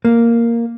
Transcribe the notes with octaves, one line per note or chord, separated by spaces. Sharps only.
A#3